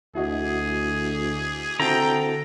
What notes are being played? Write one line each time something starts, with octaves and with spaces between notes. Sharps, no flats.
D2 E4 F#4 G#4 D#5
D3 C4 E4 F#4 A4 G5 A#5